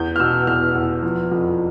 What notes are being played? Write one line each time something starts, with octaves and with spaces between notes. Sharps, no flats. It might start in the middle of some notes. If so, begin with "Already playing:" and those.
Already playing: E2 G6
F6
B2 E6
E2 F6
E2
F3
F2